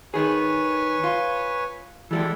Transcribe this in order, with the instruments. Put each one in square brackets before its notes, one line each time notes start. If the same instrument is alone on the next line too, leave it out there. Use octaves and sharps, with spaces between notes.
[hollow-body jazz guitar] D#3 G#4 [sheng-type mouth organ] B4 C#5 G#5
[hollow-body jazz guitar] F4
[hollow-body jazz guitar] E3 G3 G#3 [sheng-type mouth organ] A4